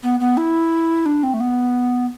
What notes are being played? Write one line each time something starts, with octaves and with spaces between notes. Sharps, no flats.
B3
B3
E4
D4
C4
A3
B3